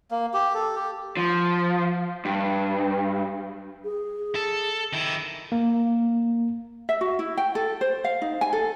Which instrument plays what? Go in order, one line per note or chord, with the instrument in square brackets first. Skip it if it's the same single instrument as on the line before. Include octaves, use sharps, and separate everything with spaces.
[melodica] A#3
G4
A4
G4
[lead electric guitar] F3
G2
[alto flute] G#4
[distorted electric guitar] A4
D#3 E4
[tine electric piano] A#3
[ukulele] E5
F#4
E4
G5
A4
C5
F5
D#4
G#5
A4